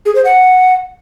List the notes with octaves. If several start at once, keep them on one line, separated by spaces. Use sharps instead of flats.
G#4
C5
F#5